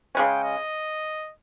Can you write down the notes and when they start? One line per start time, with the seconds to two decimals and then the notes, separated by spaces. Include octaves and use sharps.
0.15 C#3 G#3 C#4 G5
0.43 D#5